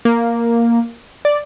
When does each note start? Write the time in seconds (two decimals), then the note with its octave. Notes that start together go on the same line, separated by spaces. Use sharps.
0.05 A#3
1.25 D5